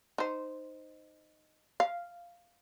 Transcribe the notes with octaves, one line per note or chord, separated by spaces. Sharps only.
D#4 C5
F5